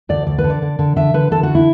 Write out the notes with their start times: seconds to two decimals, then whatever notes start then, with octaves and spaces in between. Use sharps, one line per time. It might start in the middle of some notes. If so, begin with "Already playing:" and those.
0.09 D2 D5
0.27 D2 D5
0.38 B4
0.44 D3
0.50 D5
0.62 D3
0.79 D3
0.96 D3 E5
1.14 D3 B4
1.31 D3 A4
1.43 F#4
1.55 E4